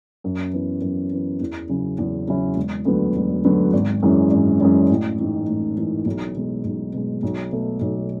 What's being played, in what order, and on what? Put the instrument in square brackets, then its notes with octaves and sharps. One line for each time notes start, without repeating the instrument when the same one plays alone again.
[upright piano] F#2
E3 B3
F#2
E3 B3
E2
C#3 F#3 C#4 E4
E2
C#3 F#3 C#4 E4
E1
D2 D3 F#3 B3
E1
D2 D3 F#3 B3
G#1
F#2 E3 G#3 C#4
G#1
F#2 E3 G#3 C#4
A1
G#2 E3
A1
G#2 E3
B1
B2 G#3
B1
B2 G#3
B1
B2 A3
B1